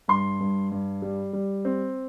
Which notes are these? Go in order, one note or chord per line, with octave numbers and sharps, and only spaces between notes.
G2 C6
G2
G2
G3
G3
C4